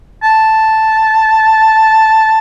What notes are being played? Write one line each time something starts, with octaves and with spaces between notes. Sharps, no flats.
A5